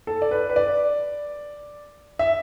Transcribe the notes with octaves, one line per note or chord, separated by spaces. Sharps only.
A4
D5
B4
B4
D5
E5